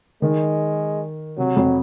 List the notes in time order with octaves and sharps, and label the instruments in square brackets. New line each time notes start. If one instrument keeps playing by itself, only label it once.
[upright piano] D#3 [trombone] G#3
[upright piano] C3 [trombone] F#3
[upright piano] F2